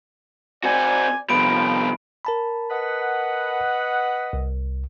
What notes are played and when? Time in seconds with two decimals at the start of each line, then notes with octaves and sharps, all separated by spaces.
0.64 C4 F#4 D5 G#5
1.30 C3 D#3 F3 G3 B3 B5 D7
2.25 A#4 A5 B5
2.70 B4 D#5 F#5
4.33 C2